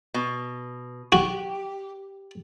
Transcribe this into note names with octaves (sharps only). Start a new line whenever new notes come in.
B2
F#4 G4